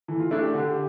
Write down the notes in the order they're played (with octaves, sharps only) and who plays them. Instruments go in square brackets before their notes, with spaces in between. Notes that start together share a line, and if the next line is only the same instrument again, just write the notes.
[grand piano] E3 [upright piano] A4
[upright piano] F4
[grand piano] A3 D4 [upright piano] E4
[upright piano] G4
[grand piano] D3 [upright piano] A4
[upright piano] G4